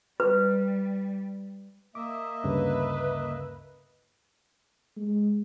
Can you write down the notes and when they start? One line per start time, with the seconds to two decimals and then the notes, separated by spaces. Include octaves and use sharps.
0.20 G3 B4
1.95 A#3 D#5 E5 D6
2.44 D2 G2 C#3 B4
4.96 G#3